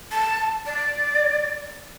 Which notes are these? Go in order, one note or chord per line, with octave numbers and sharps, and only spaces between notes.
A5
D5